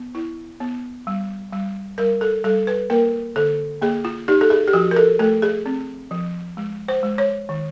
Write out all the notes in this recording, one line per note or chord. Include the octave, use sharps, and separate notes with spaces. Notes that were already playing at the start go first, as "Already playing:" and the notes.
Already playing: B3
E4
B3
G3
G3
G3 A#4
A4
G3 A4
B4
A#3 A#4
D3 A4
A#3 G#4
F4
D#4 G4
A4
G#4
G4
F3 F#4
A#4
A4
A3 A4
G#4
C4
F3
G#3
C5
G#3
C#5
D#3